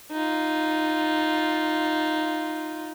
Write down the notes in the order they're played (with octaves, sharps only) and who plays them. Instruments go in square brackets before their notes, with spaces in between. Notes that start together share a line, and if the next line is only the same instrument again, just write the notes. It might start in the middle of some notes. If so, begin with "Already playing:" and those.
[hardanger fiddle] D#4 F4